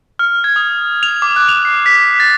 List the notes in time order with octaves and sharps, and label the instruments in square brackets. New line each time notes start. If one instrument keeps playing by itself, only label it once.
[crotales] F6
G#6
D#6
F7
D6
F#6
F7
C7
B6
A6